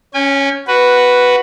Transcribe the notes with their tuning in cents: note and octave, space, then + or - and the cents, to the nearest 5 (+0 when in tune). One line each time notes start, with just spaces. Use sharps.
C#4 +0 G#5 -40
F#4 +0 B4 +0